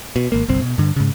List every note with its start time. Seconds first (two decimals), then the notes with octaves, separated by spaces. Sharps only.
0.16 B2
0.32 G#1 A#3
0.48 G1 C2 C4
0.62 B2
0.78 G2 D3
0.96 G#2 C#3